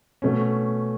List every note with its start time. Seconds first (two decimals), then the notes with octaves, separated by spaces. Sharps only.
0.22 B2 A3 C#4